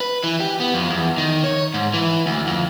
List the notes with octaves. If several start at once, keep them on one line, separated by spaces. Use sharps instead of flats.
B4
E3
G4
B3
F2
E2
D#3
C#5
G#2
E3
D2
F2